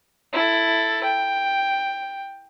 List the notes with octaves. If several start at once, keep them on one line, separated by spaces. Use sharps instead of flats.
E4 A4
G5